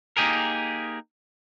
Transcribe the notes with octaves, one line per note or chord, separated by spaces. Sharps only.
A#3 D#4 G4 G#4 A#4